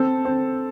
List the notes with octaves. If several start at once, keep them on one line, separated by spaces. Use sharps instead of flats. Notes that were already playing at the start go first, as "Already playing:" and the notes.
Already playing: C4 A4
C4